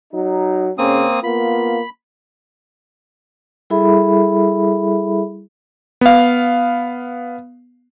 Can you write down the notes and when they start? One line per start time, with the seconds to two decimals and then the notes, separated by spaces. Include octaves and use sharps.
0.13 F#3 D#4
0.78 C#3 A#3 C4 C#4 D#6
1.23 A#3 B3 F4 B5
3.70 G3 E4 G#4 A4 E5 B5
6.01 B3 F5